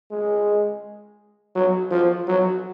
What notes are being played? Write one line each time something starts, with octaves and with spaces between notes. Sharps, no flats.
G#3
F#3
F3
F#3